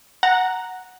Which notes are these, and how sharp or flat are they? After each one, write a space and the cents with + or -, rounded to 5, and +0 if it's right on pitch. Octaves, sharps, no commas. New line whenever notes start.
F#5 +0 A#5 +0